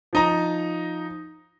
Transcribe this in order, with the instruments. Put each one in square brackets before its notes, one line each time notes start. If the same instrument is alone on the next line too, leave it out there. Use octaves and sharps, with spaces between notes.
[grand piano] F3 D#4 A#5